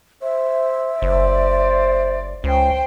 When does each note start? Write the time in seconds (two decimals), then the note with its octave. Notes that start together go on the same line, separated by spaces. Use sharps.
0.22 C5 E5
1.02 F#1 C5 D5
2.44 C#2 C#4 C5 G5